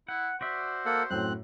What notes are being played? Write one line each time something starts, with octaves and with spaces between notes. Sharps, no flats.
E4 F#5
F#4 C5 D5 E5
A#3 A4 F#5
F#2 A2 F#3 C4 F#6